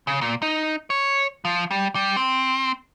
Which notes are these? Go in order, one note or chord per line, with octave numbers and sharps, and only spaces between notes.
C#3
A#2
D#4
C#5
F3
G3
G3
C4